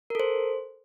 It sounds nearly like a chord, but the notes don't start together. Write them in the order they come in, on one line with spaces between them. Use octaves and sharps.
A#4 A4 C5